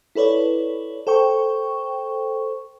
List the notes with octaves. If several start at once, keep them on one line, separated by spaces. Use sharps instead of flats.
E4 A4 B4 C#5 D5
A4 C5 G5 C#6